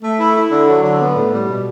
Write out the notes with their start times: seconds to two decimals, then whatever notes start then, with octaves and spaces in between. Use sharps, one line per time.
0.03 A3
0.18 E4
0.35 E4
0.51 D3
0.68 F#3
0.83 D3
1.00 B3
1.16 A2
1.32 G3
1.48 B2